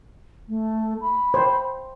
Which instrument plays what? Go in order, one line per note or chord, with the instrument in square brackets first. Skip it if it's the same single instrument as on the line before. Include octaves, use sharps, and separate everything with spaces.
[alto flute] A3
B5
[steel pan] C5